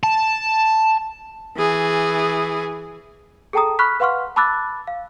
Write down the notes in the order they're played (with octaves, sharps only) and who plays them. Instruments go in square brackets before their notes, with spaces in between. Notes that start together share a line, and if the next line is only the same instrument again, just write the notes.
[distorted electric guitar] A5
[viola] E3 G#4
[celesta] G#4 A4 G5 A5 A#5 D#6
B5 C#6 F6 F#6 B6
B4 F5 F#5 C6 C#6 F6
A5 B5 D6 E6 F#6 A6
F5